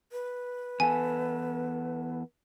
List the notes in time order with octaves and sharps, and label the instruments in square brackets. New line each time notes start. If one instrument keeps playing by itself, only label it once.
[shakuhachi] B4
[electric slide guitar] E2 B3 A4 [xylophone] G#5